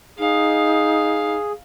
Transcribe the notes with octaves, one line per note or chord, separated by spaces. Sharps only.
D#4 G#4 F5